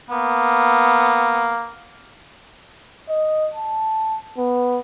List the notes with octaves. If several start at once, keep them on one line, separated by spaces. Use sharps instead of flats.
A#3 B3
D#5
A5
B3